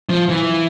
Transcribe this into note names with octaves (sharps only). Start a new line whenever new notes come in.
F3
E3